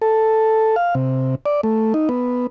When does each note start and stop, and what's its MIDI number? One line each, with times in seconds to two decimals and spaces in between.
0.02 0.76 69
0.76 0.95 77
0.95 1.35 48
1.46 1.61 74
1.63 1.93 57
1.94 2.09 63
2.09 2.47 59